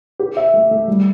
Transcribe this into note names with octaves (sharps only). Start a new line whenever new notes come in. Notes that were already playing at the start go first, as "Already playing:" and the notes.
G4
E5
A3
A3
G3